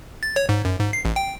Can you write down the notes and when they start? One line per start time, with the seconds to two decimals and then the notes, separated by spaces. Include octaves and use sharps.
0.23 A6
0.36 C#5
0.49 G#2
0.65 F#2
0.79 G#2
0.93 C7
1.05 A1
1.16 G5